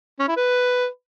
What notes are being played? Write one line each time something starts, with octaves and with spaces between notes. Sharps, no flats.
C#4
E4
B4